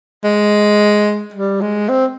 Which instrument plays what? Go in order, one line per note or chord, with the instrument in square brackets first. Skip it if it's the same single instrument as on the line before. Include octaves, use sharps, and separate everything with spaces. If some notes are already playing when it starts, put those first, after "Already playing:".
[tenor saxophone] G#3
G3
G#3
C4